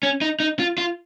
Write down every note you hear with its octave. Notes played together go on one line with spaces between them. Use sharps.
C#4
D#4
D#4
F4
F4